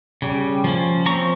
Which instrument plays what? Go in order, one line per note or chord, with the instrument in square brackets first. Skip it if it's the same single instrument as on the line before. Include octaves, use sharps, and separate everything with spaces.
[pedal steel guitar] C#3 G3
F3 A#3 C#4
F3 C4 A#5 C#6